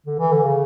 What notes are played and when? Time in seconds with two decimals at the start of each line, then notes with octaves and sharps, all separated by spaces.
0.07 D3
0.19 E3
0.32 D3
0.44 C#3